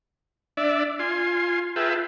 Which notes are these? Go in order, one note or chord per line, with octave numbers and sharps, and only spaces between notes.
D4 D5 E5
F4 G#5 C6
F4 G#4 B4 E5 G5 A5